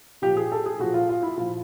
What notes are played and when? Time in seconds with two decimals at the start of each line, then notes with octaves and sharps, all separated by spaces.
0.22 A#2 F3 G4
0.37 G#4
0.52 A4
0.66 G#4
0.79 A#2 F3 F#4
0.94 F4
1.09 F4
1.23 E4
1.37 A#2 F3 F4